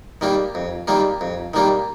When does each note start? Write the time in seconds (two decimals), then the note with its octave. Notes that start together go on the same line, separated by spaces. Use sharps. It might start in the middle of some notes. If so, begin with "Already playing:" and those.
0.21 D#3 G3 A#3
0.55 F2
0.87 D#3 G3 A#3
1.21 F2
1.54 D#3 G3 A#3